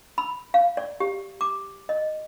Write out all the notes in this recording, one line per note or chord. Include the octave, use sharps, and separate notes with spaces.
B5
F5
D5
G4
D6
D#5